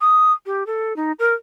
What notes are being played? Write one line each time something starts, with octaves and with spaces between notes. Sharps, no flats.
D#6
G4
A4
D#4
A#4